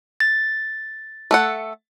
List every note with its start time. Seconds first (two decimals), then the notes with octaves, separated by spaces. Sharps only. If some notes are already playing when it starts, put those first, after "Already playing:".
0.20 A6
1.31 A3 A4 F#5